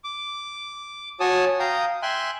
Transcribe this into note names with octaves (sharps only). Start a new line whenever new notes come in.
D6
F#4 C#5 G#5 A5 D#6
F5 G5 A#5 D#6
E5 G5 G#5 C6 F#6